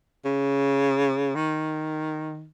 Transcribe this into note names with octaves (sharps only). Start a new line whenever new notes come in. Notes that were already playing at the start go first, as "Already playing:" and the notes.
C#3
D#3